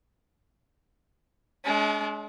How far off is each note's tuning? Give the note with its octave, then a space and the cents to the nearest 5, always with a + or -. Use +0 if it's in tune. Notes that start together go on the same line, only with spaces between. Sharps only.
G#3 +35 D4 -35